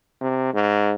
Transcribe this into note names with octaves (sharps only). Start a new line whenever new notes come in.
C3
G#2